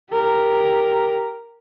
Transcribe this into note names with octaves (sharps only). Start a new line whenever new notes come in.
G4 A#4